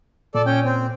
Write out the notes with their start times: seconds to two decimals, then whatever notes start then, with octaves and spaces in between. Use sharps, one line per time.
0.35 A#2 A4 D5
0.46 C#4 G5
0.65 C4